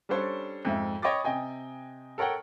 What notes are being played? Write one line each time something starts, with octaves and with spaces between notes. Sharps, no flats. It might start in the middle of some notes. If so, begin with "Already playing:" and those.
G3 C#4 D4 A4 C5 C#5
F2 G#2 E5
C#5 D#5 G5 B5 D6 A6
C3 D#5 G5 G#5
A4 A#4 C#5 F#5 G5